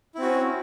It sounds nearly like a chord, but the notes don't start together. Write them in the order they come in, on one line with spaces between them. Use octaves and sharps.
E4 C4 F#4 C#4